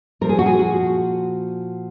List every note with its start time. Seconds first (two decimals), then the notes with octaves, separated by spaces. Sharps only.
0.21 A#2 F3 A#4
0.29 G#4
0.39 F#4
0.46 G#4
0.59 F#4